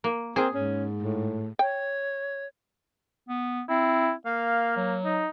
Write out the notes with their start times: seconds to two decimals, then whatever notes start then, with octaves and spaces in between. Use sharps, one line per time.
0.04 A#3
0.36 C4 G#4 A#4
0.54 G#2 C#4
1.03 A2
1.59 C#5 G5
3.29 B3
3.69 C4 E4
4.26 A#3 F5
4.77 F#3
5.05 D#4